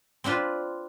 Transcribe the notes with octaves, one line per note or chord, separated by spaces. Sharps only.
C4 D4 F4 B4